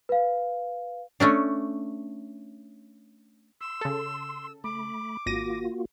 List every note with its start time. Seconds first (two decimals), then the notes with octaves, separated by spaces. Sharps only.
0.09 B4 F5
1.20 A3 C#4 D4
3.61 C6 E6
3.81 C#3 A4
4.64 A3 B5 D6
5.26 G#1 A#3 F4 F#4 A#6 D#7